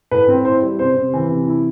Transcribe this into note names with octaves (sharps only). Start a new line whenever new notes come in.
A2 B4
C4
E4 C5
G3
C3 C5
C3
E3
C3
E4